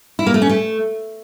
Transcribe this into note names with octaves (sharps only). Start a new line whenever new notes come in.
E4
A#3
A3
C#4
A3